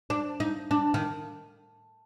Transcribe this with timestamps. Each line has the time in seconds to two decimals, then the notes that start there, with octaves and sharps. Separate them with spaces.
0.10 D4
0.40 D#4
0.71 D4
0.94 D#3